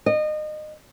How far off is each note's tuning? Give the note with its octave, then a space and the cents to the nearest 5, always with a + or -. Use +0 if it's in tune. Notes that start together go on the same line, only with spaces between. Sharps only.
D#5 -30